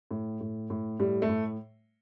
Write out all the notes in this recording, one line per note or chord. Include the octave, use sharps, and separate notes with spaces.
A2
A2
A2
A2 G3
A3
A2